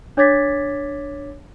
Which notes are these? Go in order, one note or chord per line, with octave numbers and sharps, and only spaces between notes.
D4 C#5 D6 G#6 A6 B6